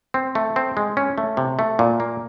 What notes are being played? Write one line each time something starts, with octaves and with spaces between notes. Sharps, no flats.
C4
A3
C4
G#3
C#4
A3
C3
A3
A#2
A#3